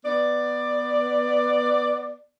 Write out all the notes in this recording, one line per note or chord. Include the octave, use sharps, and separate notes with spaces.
B3 D5